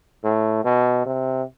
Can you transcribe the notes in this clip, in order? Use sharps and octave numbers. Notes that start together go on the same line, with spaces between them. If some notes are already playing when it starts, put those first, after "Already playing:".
A2
B2
C3